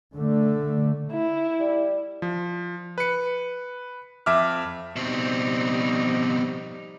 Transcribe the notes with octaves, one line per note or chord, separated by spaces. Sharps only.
D3 A3
E4
G3
F3
B4 C#7
F2 E5 D6 F6
B2 F3 G3 C4 D#4